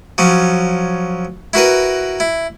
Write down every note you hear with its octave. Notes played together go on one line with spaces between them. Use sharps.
F3 F#3 C#4
E4 F#4 A#4 B4
E4